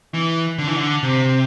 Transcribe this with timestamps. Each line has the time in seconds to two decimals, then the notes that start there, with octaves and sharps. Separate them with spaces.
0.14 E3
0.58 D3
0.67 E3
0.76 D3
1.03 C3